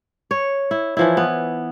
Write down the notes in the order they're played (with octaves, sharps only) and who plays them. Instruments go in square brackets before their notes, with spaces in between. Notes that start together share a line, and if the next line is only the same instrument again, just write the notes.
[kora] C#5
E4
E3 F3 E4
B3